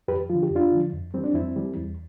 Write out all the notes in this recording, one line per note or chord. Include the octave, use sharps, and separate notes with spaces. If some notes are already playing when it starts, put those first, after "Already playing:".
F2 G4 B4
D3 F3 F4
G4
F2
D4 F4
D3 F3
F2
E3 G3 C4
D4
F2 C4 E4
E3 G3
E2